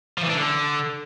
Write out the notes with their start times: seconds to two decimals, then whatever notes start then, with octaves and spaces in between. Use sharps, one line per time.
0.18 F3
0.24 E3
0.29 D4
0.35 D3